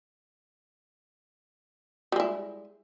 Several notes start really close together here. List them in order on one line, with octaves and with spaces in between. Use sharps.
G3 G#3 E4